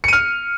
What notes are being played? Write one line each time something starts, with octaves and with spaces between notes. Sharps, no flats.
F6 C#7 D#7